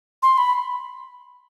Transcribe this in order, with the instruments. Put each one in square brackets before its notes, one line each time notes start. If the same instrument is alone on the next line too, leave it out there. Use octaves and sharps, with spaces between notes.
[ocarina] C6
B5